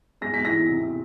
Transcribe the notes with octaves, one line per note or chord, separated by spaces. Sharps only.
G#3 A#6
B6
E2 A#6
C3